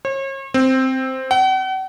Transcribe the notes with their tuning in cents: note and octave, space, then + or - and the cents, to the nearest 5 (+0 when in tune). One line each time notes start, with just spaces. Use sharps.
C#5 -40
C4 +0
F#5 +45